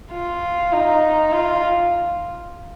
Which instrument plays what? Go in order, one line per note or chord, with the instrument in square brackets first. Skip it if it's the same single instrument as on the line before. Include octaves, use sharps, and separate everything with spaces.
[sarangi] F4
D#4
F4